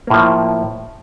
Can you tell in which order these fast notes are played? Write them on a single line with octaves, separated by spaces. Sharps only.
A#3 A2 F3